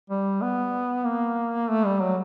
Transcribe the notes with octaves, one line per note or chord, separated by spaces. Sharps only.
G3
B3
A#3
A3
G3
F#3